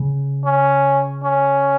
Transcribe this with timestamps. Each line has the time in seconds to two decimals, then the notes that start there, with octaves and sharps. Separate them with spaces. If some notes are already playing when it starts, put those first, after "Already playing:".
Already playing: C#3
0.45 C#4
1.24 C#4